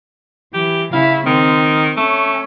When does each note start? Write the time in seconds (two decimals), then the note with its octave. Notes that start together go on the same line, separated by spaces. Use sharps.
0.54 E3 G4
0.93 C#3 E4 F5
1.26 D#3 C4
1.97 A3 C#4